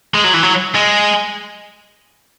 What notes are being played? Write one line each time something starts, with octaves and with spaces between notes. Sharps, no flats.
G#3
F#3
E3
F#3
G#3